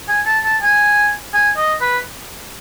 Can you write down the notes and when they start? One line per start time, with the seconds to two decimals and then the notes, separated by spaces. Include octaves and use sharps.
0.08 G#5
0.26 A5
0.44 A5
0.62 G#5
1.34 G#5
1.57 D#5
1.81 B4